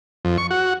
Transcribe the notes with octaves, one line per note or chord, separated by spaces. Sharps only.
F2
C#6
F#4